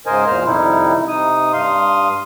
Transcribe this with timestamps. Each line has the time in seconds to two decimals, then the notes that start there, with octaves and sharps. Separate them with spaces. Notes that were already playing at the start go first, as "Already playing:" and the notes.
0.06 G#2 C#3 A#4 C5 D#5 G#5
0.27 E2 A#2 C5 F6
0.46 F2 C3 D#3 G3 D#4 E4
1.08 C3 D#4 D#6
1.53 G2 F5 C6 D#6